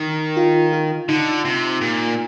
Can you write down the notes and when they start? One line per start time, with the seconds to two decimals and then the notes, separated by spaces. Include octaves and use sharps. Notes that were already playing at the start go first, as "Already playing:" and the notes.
Already playing: D#3 D#4
0.37 F4
0.73 F4
1.09 D3 D#4
1.45 C3
1.81 A#2